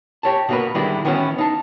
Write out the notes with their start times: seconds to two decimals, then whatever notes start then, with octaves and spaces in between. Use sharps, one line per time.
0.23 G4 C#5 A5
0.49 B2 A#3 F#4 A#4 B4
0.75 D3 D#3 G3 G#3 D4 E4
1.05 D#3 E3 B3 C#4 E4 F#4
1.38 D#4 A5